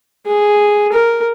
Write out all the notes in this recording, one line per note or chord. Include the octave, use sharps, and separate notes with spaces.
G#4
A#4